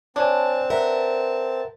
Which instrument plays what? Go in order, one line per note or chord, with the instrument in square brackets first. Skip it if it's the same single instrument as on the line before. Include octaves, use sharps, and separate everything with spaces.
[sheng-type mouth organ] C4 A5 [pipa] D4 [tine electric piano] C#5 G#5
[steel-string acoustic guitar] A#4 [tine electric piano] B4 E5 F#5